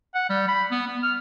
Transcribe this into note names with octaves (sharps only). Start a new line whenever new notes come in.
F#5
G3
B5
B3
B3
F6